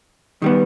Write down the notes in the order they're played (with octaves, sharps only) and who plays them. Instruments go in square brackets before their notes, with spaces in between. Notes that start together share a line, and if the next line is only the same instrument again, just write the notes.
[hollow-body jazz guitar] D#3 G3 B3